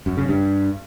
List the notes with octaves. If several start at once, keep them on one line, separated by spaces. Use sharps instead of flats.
F#2
C#3
G2